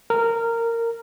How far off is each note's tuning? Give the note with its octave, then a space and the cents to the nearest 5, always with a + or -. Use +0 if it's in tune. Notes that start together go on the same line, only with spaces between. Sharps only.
A#4 -15